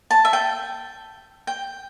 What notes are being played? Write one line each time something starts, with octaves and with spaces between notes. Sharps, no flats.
A5
E5
G5
G5